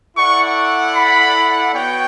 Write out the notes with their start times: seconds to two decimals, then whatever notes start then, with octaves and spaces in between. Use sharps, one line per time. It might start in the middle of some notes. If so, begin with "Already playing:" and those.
0.17 E4 A4 D5 F#5 C#6
0.95 B5
1.74 B3 F#4 C#5 G5